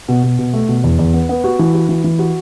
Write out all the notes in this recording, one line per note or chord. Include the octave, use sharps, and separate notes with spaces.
B2
B2
B2
A3
B2
E2
E2
B3
B3
F#4
E3
F#4
E3
E3
F#4